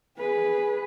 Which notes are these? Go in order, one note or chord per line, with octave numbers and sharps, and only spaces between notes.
G#4 B4